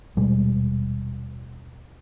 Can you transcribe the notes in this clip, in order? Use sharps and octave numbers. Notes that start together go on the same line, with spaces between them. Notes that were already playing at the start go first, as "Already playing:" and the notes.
D#1 B2 G3 G#3